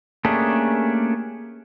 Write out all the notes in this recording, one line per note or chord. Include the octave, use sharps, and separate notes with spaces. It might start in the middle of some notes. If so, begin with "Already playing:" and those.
A3 A#3 C#4 D4 G4 G#4